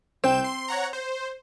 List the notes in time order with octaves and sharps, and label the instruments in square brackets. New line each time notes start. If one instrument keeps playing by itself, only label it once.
[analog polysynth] C2 G6 E7 [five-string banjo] C4
[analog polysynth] C6
C#5 F#5 A#5
C5